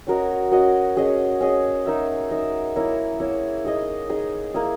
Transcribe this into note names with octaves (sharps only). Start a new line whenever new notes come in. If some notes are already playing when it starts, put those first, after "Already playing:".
C#4 F#4 A#4 D#5
C#4 F#4 A#4 D#5
C#4 G#4 D#5
C#4 G#4 D#5
D#4 A#4 E5
D#4 A#4 E5
A#3 E4 A#4 C#5
A#3 E4 A#4 C#5
D#4 G#4 D#5
D#4 G#4 D#5
A#3 E4 G#4